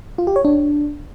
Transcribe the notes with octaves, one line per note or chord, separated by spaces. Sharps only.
F4
G4
C#5
D4